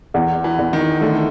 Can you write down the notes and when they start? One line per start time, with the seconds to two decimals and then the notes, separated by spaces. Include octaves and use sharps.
0.14 E2
0.44 E3
0.59 E2
0.73 D#3
1.01 D3 A3